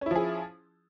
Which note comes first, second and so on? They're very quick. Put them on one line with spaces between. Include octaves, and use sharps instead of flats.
C#4 E4 F3 G#4